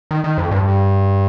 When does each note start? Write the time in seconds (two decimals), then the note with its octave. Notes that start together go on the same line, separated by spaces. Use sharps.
0.11 D#3
0.24 D#3
0.38 F2
0.51 G2